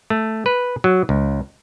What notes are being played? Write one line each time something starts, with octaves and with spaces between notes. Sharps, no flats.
A3
B4
F#3
C#2